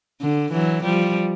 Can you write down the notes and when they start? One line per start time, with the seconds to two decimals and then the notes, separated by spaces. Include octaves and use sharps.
0.21 D3
0.52 E3 F#3
0.83 F3 G3